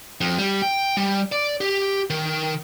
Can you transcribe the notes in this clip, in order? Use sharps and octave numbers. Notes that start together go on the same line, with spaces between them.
F2
G3
G5
G3
D5
G4
D#3